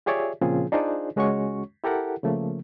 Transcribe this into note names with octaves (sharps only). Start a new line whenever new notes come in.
F4 G4 G#4 C#5 D5 E5
A#2 C#3 F3 C4 F4 G#4
D4 D#4 F4 G#4 C5 D5
C#2 G#3 C#4 F#4 C#5 C#6
E4 G4 A4 A#4 F#5
C#3 F3 A3 A#3